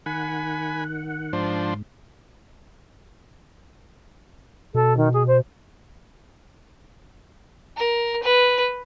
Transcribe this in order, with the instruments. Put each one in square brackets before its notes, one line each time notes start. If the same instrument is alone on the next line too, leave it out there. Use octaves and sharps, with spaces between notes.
[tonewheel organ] D#3 F#5 [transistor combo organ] G#5 B5
[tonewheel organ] G#2 [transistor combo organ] F3 D4 C5
[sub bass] B2 [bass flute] A4
[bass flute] D#3
G#4
C5
[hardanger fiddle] A#4
B4